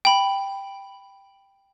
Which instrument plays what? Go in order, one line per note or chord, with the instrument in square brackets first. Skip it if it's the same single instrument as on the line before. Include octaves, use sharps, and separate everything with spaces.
[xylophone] G5 B5